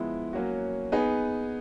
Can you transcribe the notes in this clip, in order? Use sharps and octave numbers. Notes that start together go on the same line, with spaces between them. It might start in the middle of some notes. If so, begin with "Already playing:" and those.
Already playing: F3 G#3 B3 E4
F#3 A#3 C#4 F#4
B3 D#4 G#4 B4